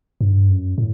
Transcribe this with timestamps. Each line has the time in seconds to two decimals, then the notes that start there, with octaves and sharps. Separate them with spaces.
0.21 G2
0.49 F#2
0.78 A2